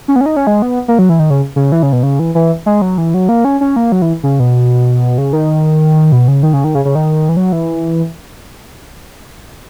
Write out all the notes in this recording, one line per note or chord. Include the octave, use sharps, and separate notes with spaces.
C#4
B3
C#4
D#4
C#4
G#3
B3
A#3
F#3
E3
D#3
C#3
C#3
E3
C#3
B2
C#3
E3
E3
G#3
F#3
E3
F#3
A#3
C#4
C#4
A#3
F#3
E3
C#3
B2
C#3
D#3
B2
C#3
D#3
C#3
D#3
C#3
C#3
D#3
E3
F#3
E3